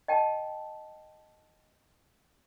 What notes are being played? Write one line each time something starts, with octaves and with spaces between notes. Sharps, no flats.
D#5 G5 A5